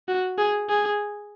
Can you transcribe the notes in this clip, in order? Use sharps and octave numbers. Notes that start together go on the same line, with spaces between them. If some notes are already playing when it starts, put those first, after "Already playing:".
F#4
G#4
G#4